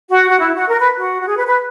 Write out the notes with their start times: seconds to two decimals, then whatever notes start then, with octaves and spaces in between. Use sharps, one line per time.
0.10 F#4
0.29 F#4
0.39 E4
0.54 F#4
0.68 A#4
0.78 B4
0.97 F#4
1.21 F#4
1.28 G#4
1.36 B4
1.47 B4